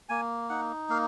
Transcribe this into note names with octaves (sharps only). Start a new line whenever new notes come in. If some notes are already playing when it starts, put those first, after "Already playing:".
A#3 G#5
D#4 F#5
A#3 F5